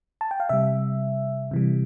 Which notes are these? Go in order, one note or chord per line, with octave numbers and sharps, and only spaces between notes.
A5
G5
F5
C3 G3 E5
C3 E3 G3